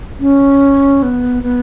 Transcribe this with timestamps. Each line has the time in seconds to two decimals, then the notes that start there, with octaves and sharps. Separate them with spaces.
0.19 C#4
1.03 B3
1.43 B3